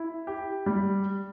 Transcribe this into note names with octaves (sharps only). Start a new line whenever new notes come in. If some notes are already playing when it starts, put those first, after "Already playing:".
Already playing: E4
G4
G3